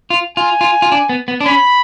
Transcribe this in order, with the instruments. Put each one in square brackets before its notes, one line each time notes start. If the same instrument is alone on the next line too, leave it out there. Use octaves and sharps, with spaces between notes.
[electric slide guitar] F4
[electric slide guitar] F4 [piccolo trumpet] G#5
[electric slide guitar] F4
F4
D4
B3
B3
D4
[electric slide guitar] C#4 [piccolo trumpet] B5